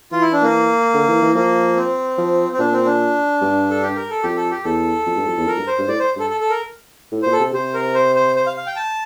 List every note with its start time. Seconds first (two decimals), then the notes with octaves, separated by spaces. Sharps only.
0.12 E3 F4
0.22 E4
0.33 D4
0.42 A#3
0.94 D3
1.08 E3
1.22 E3
1.35 F3 A#3
1.77 C4
2.18 F3
2.52 C4
2.59 A#2 D4
2.73 C4
2.86 D4
3.41 G2
3.70 A4
3.82 G4
3.96 A#4
4.10 A4
4.23 F2 G4
4.37 A4
4.51 G4
4.64 E2 A4
5.06 F2
5.16 G2
5.27 F2
5.37 E2
5.47 F2 A#4
5.58 G2
5.67 C5
5.78 G2
5.88 A2 D5
5.99 C5
6.16 G2 A4
6.30 A4
6.41 A4
6.50 A#4
7.12 A2
7.22 A#2 C5
7.32 A4
7.40 C3
7.53 C3 C5
7.74 A#4
7.94 C5
8.15 C5
8.36 C5
8.46 F5
8.57 F5
8.67 G5
8.76 A5